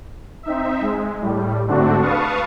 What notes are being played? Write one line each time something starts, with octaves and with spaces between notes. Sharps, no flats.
C4 D#4 E5
G#3
A2 G3
G#2 D3 A3 C4 D4 F#4
B4 F5 A5 C#6 D#6